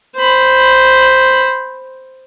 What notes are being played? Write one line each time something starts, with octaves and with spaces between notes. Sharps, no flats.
C5 B5